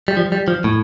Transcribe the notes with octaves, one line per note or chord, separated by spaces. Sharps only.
G3
F3
G3
F3
A2